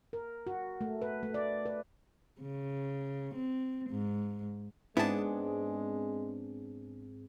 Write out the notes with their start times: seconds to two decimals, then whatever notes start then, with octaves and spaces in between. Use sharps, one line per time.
0.13 A#4
0.47 F#4
0.81 A3
1.02 B4
1.23 A3
1.34 D5
1.66 B4
2.41 C#3
3.35 C4
3.90 G#2
4.97 G#2 G#3 B3 C4 D4 E4 G#4 A5